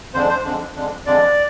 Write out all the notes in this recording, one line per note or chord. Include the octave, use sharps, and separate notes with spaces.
F2 D3 G#3 D4 C5
C5
F2 D3 G#3 D4
F2 D3 G#3 D4
F2 D3 G#3 D4 D5